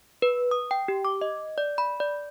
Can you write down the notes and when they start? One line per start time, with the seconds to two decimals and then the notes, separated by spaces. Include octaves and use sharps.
0.22 B4
0.51 D#6
0.71 G5
0.88 G4
1.05 D6
1.21 D#5
1.58 D5
1.78 B5
2.00 D5